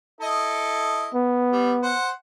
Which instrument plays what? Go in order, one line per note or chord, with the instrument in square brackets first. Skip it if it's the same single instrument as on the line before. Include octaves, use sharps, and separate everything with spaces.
[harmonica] E4 A4 D#5
[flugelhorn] B3
[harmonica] G3
C5 F#5